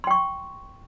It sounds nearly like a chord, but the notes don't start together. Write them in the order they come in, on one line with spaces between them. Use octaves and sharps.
C6 G5 C#6